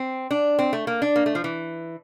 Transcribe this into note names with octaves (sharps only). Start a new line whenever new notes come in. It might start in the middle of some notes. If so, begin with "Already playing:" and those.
Already playing: C4
D4
C4
A3
A#3
D4
A#3
A3
F3
E3